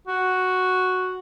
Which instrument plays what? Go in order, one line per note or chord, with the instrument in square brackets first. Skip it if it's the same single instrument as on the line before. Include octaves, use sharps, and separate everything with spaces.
[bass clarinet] F#4